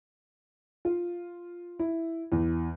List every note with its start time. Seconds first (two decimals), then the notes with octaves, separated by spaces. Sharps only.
0.85 F4
1.79 E4
2.32 E2